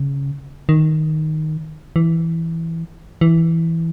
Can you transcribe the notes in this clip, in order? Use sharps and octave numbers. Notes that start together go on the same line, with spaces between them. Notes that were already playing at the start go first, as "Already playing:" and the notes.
Already playing: C#3
D#3
E3
E3